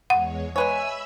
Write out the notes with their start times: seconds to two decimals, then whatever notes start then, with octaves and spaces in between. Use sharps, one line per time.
0.10 E2 G#3 C#5 F#5
0.56 G#3 B4 C#5 E5 G#5 B5 E6